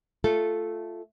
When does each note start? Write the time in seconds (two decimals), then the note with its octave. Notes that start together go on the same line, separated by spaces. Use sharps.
0.24 A3 F4 A4